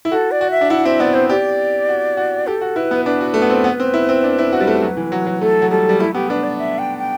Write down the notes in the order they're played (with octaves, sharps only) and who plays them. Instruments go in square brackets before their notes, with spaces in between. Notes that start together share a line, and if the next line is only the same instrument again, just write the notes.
[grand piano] E4
[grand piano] F#4 [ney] A4
[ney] D5
[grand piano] F#4
[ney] E5
[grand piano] D4
[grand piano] E4 [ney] F#5
[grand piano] C4 [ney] E5
[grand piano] B3 [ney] D5
[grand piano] C4 [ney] C5
[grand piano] G4 [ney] D5
[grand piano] F#4
F#4
[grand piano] G4 [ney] A4
[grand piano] F#4
[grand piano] E4 [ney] B4
[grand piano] B3
[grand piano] D4 [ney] B4
[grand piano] F#4
A3
B3
C4
B3
C4
E4
C4
D4
E4
F#4
G3
A3
F#3
E3
F#3
F#3
[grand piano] A3 [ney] A4
[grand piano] F#3
[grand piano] G3 [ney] A4
[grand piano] G3
[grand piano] A3 [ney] E4
[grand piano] B3 [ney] G4
[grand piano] D4 [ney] B4
[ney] D5
E5
G5
G5